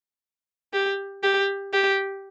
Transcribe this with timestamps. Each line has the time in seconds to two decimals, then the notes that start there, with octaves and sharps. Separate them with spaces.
0.73 G4
1.23 G4
1.73 G4